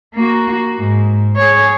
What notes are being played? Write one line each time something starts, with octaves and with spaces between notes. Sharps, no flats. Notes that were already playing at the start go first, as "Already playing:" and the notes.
A#3 F#4
G#2
G#4 C#5